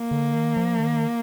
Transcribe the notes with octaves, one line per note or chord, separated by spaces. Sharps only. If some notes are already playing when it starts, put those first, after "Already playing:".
Already playing: A#3
D3
D#3
F3
D#3